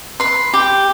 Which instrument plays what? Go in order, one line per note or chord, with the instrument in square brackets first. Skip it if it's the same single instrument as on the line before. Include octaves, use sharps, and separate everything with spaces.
[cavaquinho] B4 C6
G4